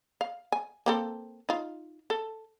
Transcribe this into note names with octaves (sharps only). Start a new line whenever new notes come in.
F5
G#5
A#3 C4 A4
D#4 F4
A4